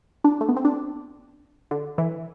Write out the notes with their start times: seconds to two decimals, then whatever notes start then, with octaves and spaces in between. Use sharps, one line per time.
0.24 D4
0.41 A3
0.49 B3
0.56 C4
0.65 D4
1.71 D3
1.98 E3